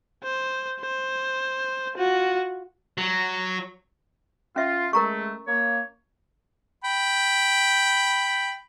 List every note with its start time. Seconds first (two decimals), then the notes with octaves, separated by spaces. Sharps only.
0.24 C5
0.81 C5
1.95 F4 F#4
2.98 F#3
4.56 C#4 F4 E5
4.93 G#3 A3 A#4 A#5 C#6
5.47 A#3 C#5
6.84 G5 B5